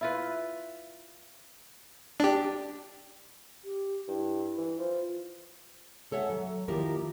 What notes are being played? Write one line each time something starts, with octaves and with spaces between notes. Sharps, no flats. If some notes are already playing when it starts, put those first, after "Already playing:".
E4 F4 B4
D4 G4
G4
G2 E4
E3
F3 F4
G#3 A4 C#5 E5 F#5
F#3
D#3 F3 A#3 E4 G4 A#4